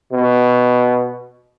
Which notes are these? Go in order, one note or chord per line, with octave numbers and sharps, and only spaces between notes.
B2